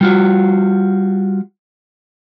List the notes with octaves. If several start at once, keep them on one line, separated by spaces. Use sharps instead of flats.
G3 F4 F#4